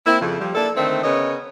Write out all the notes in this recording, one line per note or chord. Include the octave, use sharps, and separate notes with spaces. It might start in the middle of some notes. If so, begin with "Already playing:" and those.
A#3 C4 E4
F2 C#3
F3 G3
A#3 D4 E4 A4
D3 D#3 A3 C4
C#3 B3 C#4 A#4 D#5